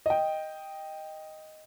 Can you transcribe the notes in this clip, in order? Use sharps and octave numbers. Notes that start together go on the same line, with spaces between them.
D#5 G5